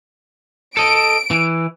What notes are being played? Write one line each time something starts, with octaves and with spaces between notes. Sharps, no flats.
A4 D#5 D7
E3